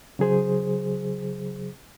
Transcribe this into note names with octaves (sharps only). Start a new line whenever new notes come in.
C#3 F#3 G#4 C5